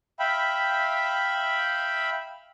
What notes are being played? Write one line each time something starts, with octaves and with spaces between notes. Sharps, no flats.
E5 F5 G5 B5